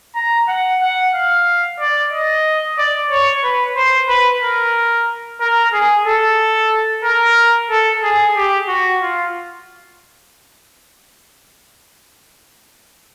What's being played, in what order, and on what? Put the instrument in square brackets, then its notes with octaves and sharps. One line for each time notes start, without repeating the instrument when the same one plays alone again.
[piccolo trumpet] A#5
F#5
F#5
F5
D5
D#5
D5
C#5
B4
C5
B4
A#4
A#4
G#4
A4
A#4
A4
G#4
G4
F#4
F4